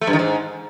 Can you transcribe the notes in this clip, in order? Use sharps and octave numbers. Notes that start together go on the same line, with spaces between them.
A3
G2
D#3
G#2